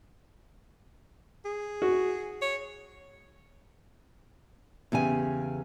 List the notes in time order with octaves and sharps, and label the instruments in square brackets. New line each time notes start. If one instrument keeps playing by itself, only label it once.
[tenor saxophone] G#4
[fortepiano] F#4
[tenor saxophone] C#5
[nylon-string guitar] E2 C#3 G4 G#5